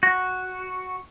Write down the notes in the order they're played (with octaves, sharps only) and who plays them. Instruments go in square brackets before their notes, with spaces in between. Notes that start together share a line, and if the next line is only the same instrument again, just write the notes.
[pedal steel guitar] F#4 [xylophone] A#6